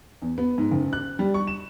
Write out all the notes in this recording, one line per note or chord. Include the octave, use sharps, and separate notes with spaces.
E2
B3
G#2
F#1
F#6
G3
C#6
E7